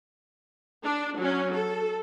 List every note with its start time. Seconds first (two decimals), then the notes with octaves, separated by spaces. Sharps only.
0.83 D4
1.18 F#3 C#4
1.54 A4